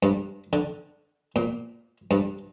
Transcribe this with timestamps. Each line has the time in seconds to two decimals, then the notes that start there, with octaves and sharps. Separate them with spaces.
0.03 G2
0.53 D3
1.36 A#2
2.11 G2